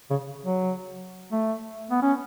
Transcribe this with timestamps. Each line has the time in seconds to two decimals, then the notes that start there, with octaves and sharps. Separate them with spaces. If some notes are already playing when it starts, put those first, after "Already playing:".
0.10 C#3
0.46 F#3
1.32 A3
1.91 B3
2.02 C#4